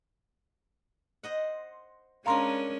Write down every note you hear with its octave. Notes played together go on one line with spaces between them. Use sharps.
C5 D#5 F#5
G#3 C#4 D4 A#4 C#5 F5 A#5 C6